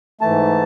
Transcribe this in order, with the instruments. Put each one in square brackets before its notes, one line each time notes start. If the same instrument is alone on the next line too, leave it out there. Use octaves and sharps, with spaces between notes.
[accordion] G#2 E3 A3 A5